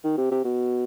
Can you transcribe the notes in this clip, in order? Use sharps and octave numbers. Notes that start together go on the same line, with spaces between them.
D#3
C3
C3
B2